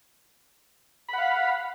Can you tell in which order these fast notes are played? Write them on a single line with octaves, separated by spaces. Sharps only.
B5 F#5 F5